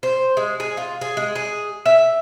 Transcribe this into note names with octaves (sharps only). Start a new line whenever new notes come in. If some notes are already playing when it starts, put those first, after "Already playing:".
C5
G#3
G#4
F4
G#4
G#3
G#4
E5